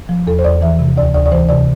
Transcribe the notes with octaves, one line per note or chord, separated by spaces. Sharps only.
F3
E2 A4
C5
E2 D5
E3 E5
C3
D2 D5
D2 D5
D5
E3 C5
C3 D5